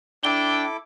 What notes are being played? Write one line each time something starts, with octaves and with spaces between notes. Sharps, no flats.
D4 E4 A4 G5 D6